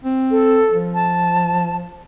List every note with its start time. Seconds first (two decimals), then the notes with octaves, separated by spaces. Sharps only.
0.04 C4
0.31 A4
0.70 F3
0.94 A5